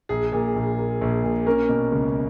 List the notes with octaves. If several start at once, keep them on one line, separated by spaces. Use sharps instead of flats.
A#1 G#4
A#2
A#1
A#3
A#1
A#2
A#3 C#4 A#4
B2
C#2